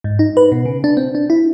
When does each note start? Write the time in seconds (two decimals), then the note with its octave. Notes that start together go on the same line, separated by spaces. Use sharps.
0.04 G#2
0.19 D#4
0.37 B4
0.52 B2
0.65 C#3
0.84 D4
0.97 C4
1.15 D4
1.30 E4